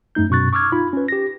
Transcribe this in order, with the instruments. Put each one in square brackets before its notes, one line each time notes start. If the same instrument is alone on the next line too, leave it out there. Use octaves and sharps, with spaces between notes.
[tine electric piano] F#2 A3 D#4 G6
F#2 B2 C#6 F#6 A6
C#6 D6 E6 F6 G#6
D#4 F4 B5
C#4 B4
G4 A#6